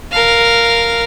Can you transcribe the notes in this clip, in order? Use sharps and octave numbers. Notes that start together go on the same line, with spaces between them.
A#4 F5